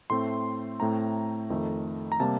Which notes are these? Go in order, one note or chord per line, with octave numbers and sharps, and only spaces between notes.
A2 A3 C4 C6
A2 A3 C4 A#5
F2 D#3 A3
A#5
C3 G3 A#3 A5